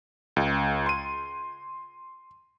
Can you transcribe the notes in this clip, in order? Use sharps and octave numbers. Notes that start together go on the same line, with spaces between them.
C#2
C6 D#7